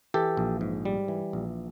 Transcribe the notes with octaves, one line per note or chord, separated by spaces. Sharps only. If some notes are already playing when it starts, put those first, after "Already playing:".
E3 G4 A4
A#1
G#2
G3
E3
A#1